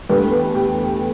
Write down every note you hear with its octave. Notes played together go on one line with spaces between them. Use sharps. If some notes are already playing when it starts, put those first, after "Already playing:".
E2 D3 A3 G4 B4
G4